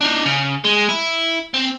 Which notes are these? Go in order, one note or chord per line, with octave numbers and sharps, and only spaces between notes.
D4 D#4
C#3
G#3
E4
C4